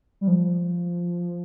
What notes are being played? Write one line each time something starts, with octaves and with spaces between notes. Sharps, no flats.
G3
F3